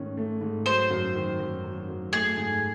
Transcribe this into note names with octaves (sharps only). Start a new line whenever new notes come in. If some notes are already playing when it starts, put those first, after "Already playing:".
Already playing: G#2 D#3 A3 C#4
A3
G#2
F#3 C5
F#2
D#3
F#2
F#3
F#2
A3 G#4
G#2